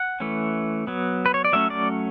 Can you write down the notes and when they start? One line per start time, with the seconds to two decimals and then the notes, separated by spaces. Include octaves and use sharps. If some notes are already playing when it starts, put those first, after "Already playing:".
Already playing: F#5
0.20 E3 A3 C#4
0.87 F#3 B3
1.26 B4
1.34 C#5
1.45 D5
1.53 F#3 A3 C#4 E5
1.70 D5